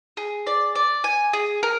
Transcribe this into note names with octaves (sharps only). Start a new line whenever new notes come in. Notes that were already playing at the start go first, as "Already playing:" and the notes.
G#4
D5
D5
G#5
G#4
A#4